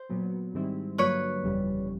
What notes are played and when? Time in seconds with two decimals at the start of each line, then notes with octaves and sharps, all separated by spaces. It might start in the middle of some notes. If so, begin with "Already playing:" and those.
Already playing: C5
0.09 A#2 F#3 B3
0.54 G#2 D#3 G3 C4 E4
0.98 G2 D3 F#3 A#3 B4 C#5
1.43 G1 F2 C#3 E3 G3